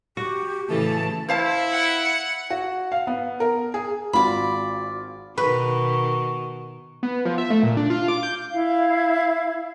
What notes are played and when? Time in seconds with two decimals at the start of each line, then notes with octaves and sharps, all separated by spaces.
0.17 F#4 G4
0.69 A2 C#3 E3 A4 A5
1.29 E4 C5 F5 A5
1.72 F#5
2.50 F#4
2.92 F5
3.07 B3
3.40 A#4
3.74 G#4
4.13 G#1 F4 F#4 D5 B5
5.38 B2 D#3 F#4 B4
7.03 B3
7.25 F3
7.38 E5
7.50 A3
7.63 A#2
7.77 D4
7.90 F4
8.08 D6
8.23 G6
8.53 E4 F5